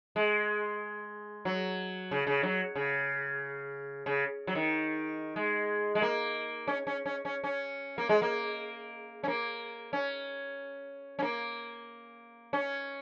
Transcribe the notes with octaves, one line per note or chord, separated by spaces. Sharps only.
G#3
F#3
C#3
C#3
F#3
C#3
C#3
F#3
D#3
G#3
G#3
A#3
C#4
C#4
C#4
C#4
C#4
A#3
G#3
A#3
C#4
A#3
C#4
C#4
A#3
C#4